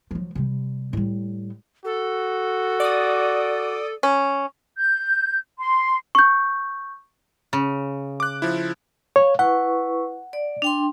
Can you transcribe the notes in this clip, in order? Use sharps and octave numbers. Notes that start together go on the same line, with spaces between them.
F3 F#3
C3 G3
A2 G3
F#4 A4
D5 D#6
C#4
G6
C6
C#6 G6
C#3
D6 F#6
F3 E4
C#5 F5
E4 B4 F#5 C#6
D5
D4 G5 C6